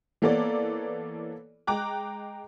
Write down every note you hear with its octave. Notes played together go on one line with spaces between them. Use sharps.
E3 A#3 B3 A4 C#5 D5
G#3 G5 A#5 D6 F#6